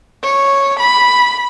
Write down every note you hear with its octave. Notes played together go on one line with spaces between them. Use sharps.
C#5
B5